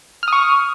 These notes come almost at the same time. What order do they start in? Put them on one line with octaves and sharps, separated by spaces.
F6 D#6 C#6